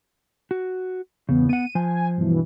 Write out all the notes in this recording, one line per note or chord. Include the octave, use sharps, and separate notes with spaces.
F#4
G1 E2 C#3 B3
B3 F#5 D#7
F3 C5 G#5
G2 B2 E3